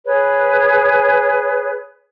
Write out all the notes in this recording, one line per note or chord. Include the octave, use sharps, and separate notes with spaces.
G#4 B4 C#5